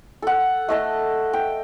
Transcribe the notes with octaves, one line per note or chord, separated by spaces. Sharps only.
A4 F#5
A3 D#5 A5
G5